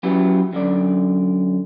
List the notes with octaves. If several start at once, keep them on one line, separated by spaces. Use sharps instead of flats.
F#3 C#4 E4 G4 B4
F#2 D3 D5